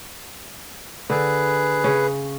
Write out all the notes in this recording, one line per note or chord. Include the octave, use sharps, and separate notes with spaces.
D3 G#4 B4
C#3 C#4 C#5